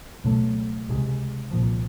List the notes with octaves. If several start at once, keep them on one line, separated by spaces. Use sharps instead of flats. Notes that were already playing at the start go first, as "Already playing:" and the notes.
C#2 B2 F#3 A3
C#2 C3 D#3 G#3
C2 A#2 F3